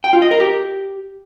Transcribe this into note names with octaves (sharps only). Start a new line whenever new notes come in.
G5
F4
D#5
A#4
G4